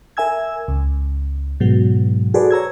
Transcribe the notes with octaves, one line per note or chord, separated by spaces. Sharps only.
A#4 E5 G#5 E6 G#6
C#2
G#2 B2 F#3
F#4 G#4 A4 B4 C5 D5
C#5 A#5 E6 G#6